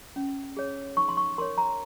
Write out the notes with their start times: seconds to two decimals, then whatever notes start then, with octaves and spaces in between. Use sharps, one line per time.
0.16 C#4
0.57 G#4 C#5
0.97 D#4 C#6
1.09 C6
1.17 C#6
1.38 A#4 C#5 C6
1.58 A#5